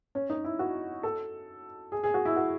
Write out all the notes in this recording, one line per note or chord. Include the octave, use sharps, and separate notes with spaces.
C#4
D#4
E4
F#4
A4
G#4
G#4
F#4
E4
F#4